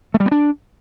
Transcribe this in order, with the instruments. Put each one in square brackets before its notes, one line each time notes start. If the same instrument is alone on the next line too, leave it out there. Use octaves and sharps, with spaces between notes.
[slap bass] A3
G3
B3
D4